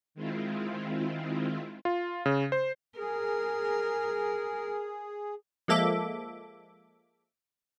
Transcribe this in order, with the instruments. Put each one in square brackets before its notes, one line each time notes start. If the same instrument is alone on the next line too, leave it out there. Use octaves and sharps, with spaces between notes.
[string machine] D#3 G#3 C4 E4 F4
[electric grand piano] F4
C#3
C5
[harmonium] G#4 [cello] A#4
[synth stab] F3 G#3 A#3 A4 E5 D6